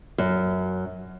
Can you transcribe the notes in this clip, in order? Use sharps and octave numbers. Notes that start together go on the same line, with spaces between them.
F#2